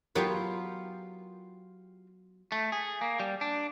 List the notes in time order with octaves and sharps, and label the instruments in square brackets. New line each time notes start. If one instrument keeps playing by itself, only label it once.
[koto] F#3 B3 [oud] F4 G4 A#4
[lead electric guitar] A3
G#4
A#3
G3
D4